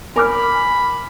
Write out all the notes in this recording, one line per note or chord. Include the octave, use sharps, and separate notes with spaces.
A#4 G#5 B5 D6 F6